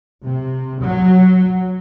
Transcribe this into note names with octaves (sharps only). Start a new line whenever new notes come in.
C3
F#3